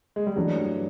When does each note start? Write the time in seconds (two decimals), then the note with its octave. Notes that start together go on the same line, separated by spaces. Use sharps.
0.16 G#3
0.27 G3
0.36 G2 E3 F#3 A3 D4 G4